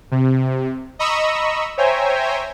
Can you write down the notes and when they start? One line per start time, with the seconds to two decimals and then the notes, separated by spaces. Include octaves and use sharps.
0.11 C3
0.99 D#5 A#5 B5 C#6 D#6 E6
1.78 C5 C#5 E5 G5 G#5 A#5